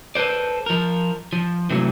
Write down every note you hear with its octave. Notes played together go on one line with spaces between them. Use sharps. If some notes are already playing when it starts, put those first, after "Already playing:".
A4 B4 C5 D5
F3 A#4
F3
C3 E3 F#3 A3